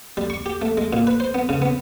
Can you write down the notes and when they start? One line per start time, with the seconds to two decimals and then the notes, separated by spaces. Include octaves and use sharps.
0.17 G3
0.30 C#6
0.46 G4
0.62 A3
0.77 G#3
0.93 A#2
1.07 B4
1.20 C5
1.34 B3
1.49 C#3
1.62 B3